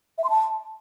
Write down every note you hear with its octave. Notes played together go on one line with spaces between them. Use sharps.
E5
C6
A5